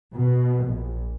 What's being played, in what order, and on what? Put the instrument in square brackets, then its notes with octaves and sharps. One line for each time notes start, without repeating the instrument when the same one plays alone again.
[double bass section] B2
A#1